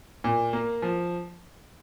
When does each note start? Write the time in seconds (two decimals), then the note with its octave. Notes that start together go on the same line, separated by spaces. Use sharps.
0.24 A#2
0.53 A#3
0.82 F3